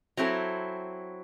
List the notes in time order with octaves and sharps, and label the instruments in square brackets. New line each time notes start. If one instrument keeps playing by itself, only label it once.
[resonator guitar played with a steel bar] F#3 C4 E4 A4